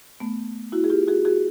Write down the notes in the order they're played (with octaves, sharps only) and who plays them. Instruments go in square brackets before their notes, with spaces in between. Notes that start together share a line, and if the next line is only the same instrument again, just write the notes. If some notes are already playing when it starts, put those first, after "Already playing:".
[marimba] A3 B3
E4 F#4
G#4
F4 G4
F#4 G#4
F#4 G#4